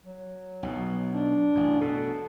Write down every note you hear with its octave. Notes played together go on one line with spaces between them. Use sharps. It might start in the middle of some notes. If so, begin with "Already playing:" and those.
F#3
B1 B2
D4
A1 F#2
B2 A4